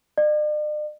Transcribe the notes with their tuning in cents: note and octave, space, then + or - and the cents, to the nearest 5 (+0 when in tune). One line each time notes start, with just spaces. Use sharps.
D5 +45